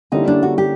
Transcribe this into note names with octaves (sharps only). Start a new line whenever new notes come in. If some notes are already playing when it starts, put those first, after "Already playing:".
D3 G3 A#3 C#4 D#4 E4
D4
F#4
G4